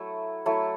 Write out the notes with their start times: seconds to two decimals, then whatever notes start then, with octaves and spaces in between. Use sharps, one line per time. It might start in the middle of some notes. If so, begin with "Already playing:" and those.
Already playing: F#3 A3 E4 A4
0.46 F#3 A3 E4 A4